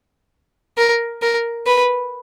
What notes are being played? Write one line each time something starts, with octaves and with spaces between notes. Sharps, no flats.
A#4
A#4
B4